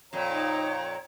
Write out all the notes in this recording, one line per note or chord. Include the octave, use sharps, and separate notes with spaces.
F2 A#2 C#5 G5 A#5
D#4